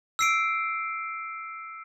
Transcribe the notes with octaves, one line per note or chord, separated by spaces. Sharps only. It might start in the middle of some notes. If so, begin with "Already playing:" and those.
E6 C7 D7